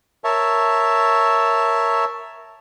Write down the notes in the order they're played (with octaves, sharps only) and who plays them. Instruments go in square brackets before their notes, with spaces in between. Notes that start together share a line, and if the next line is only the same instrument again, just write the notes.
[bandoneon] A#4 C#5 E5 A5